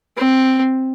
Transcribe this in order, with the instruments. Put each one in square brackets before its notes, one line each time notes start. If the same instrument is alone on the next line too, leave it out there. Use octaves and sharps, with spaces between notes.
[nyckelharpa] C4